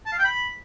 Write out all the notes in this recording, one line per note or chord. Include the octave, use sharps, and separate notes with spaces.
A5
F5
G5
B5